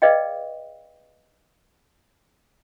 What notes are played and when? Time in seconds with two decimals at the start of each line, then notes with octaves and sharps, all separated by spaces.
0.02 G#4 B4 D5 D#5 F5 G5